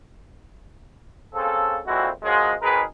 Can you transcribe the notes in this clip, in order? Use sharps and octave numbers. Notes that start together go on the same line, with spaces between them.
C#3 A#3 C4 A4
F2 A#2 G#3 C4 E4 F#4
F#2 F3 F#3 G#3
G#1 D#3 G#3 G#4 A#4 B4